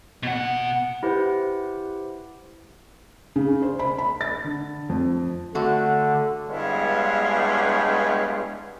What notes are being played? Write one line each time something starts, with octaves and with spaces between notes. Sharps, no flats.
B2 F#5
E4 G4 B4 C5 F#5
C#3
C5
B5
B5
A6
D3
F2
D3 A3 F#4
G2 G#3 B3 E4 C#5 F5